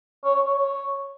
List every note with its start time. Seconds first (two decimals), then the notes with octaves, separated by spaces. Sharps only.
0.25 C#5
0.36 C#5
0.47 C#5
0.58 C#5